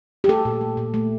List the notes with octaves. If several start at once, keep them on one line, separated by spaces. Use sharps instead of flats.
G4
A3 A4
A#2
A3
A#2
A3